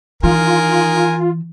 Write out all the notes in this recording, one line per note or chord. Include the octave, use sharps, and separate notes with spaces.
D#3 E3 F4 A#4 G#5